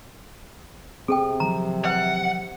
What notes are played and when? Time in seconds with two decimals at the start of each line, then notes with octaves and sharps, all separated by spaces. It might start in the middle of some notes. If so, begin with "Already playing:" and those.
1.08 C3 C4 G#4 A4 G5
1.40 D#3 F3 F#3 A#5
1.85 B4 E5 F#5